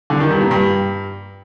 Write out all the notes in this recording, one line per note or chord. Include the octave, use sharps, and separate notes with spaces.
D3
D#3
G2
A#2
G2